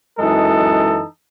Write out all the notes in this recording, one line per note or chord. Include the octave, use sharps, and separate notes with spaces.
F#2 E3 G#3 D#4 A4